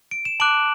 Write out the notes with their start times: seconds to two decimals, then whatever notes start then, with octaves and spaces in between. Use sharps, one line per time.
0.11 D7
0.25 E7
0.40 A5 D6 F#6 D7 F#7